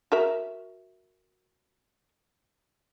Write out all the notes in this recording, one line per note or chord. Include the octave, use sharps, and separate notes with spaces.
F#4 A#4 E5